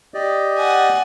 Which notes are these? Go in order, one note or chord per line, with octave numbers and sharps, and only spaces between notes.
G4 D5 D#5
F#5 G#5